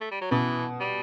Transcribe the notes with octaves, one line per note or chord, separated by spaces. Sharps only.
A3
G3
F#3
B2 E3
G3